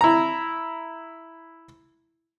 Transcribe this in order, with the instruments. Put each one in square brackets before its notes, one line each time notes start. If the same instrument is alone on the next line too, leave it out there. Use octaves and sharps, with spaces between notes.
[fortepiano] E4 A#5